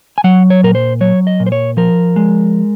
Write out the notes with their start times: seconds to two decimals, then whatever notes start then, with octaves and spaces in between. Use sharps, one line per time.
0.18 G#5
0.24 F#3 F#5
0.50 C#5
0.63 A#2 A#4
0.75 C5
1.01 F#3 C#5
1.27 D#5
1.40 A#2
1.46 C5
1.52 C#5
1.77 F3 A#4
2.16 G#3